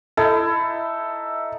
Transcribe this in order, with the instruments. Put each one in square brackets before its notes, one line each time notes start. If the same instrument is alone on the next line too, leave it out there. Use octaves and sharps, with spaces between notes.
[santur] D#4 E4 [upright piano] A4